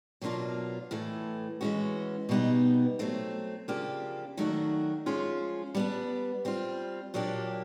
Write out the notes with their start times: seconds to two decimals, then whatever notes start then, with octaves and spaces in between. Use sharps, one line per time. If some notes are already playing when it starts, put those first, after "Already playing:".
0.22 B2 F#3 A#3 D4 F4
0.91 A2 E3 A3
1.61 E3 G#3 C#4 F#4
2.29 B2 G3 B3 D#4
2.99 F#3 A3 C4
3.68 C#3 F3 A#3 D4 G4
4.37 D#3 F#3 A3 D4 F#4
5.06 F3 G#3 C#4 F4
5.75 G3 B3 D4
6.45 G3 C4 F4
7.14 A#2 F#3 A#3 D4 G4